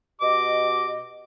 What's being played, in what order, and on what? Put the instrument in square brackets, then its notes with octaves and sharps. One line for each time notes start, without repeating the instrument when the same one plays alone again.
[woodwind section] B2 G4 D#5 [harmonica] D6